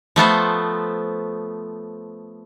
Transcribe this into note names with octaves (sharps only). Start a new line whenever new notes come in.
F3 A3 B3 C5